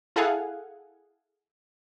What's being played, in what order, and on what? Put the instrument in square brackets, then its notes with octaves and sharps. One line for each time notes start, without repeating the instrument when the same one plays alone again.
[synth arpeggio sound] E4 G#4 A4 F5 F#5 G#5